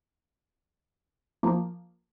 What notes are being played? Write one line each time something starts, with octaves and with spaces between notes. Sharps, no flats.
F3 A#3